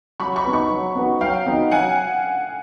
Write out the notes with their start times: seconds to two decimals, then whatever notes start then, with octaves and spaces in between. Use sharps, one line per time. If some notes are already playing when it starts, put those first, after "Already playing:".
0.20 F#3 B5 C#6
0.36 B5 C#6
0.45 B3 D#4 F#4 B4
0.53 B5 C#6
0.70 F#3
0.95 B3 D#4 F#4 B4
1.21 F#3 F5 G5
1.46 B3 D#4 F#4 B4
1.71 F#3 F#5 G#5